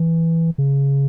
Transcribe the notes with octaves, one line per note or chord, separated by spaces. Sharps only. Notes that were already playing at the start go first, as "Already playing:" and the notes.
Already playing: E3
C#3